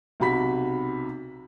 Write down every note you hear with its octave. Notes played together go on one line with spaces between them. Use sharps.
B1 C3 F#4 B5 B6